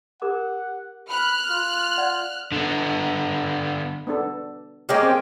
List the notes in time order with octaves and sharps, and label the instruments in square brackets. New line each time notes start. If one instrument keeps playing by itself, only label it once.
[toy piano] G4 A#4 D6 [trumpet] F#5
[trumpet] B5 [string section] F6 F#6
[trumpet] F4
[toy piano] D5 F#5
[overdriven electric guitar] D3 B3
[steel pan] B3 D4 A4
[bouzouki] G#3 A#3 C#4 [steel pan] G4 D#5 G5
[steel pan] C4 G5